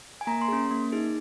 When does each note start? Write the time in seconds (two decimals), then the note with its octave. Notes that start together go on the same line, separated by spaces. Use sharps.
0.21 G#5
0.27 A#3 A#5
0.42 C6
0.48 C#4 G#4
0.71 A#3
0.92 D#4 G#4